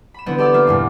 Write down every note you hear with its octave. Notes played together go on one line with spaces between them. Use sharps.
B5 E7
D3 E3 B3 C4
G4 A4 D5 E6
A#3 F4 E5
E2 G2 A#2